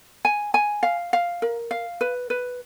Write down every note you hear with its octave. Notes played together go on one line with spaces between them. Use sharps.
G#5
G#5
F5
F5
A#4
F5
B4
B4